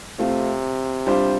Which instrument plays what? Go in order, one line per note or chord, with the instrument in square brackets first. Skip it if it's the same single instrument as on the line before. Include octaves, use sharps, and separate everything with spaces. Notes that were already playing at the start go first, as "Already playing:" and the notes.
[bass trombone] C3 [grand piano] A3 C4 F4
[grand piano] G3 D4 F4 C5